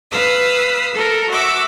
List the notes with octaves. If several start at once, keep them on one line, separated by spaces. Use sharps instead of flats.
B4 F5 D#6 E6
A4 A#4
F#4 E5 D6 E6